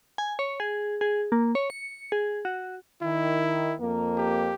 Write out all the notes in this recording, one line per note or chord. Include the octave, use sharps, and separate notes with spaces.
G#5
C#5
G#4
G#4
A#3
C#5
C#7
G#4
F#4
D#3 E4
F2 A#3
G4